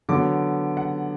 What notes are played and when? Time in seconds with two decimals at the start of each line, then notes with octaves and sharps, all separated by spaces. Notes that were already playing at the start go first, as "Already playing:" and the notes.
0.09 D3 F#3 B3 D6
0.77 F#5